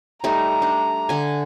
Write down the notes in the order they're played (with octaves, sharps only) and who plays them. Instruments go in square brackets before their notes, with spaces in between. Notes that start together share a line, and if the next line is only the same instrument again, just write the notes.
[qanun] G3 A3 D#4 [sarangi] A#5
[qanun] D4
D3 G#5